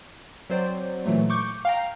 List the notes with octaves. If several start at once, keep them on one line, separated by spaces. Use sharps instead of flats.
F#3 C4 C5 D5
A#2 E3 F#3 A3
C#6 D6 G6 C#7
F5 G5 A#5